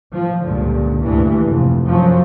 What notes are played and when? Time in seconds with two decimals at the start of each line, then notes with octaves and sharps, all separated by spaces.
0.13 F3
0.43 C#2 G2 A#2 D3
1.01 D2 G2 E3
1.43 F1 F2
1.85 F#2 F3 F#3